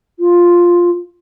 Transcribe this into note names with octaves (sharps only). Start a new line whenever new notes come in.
F4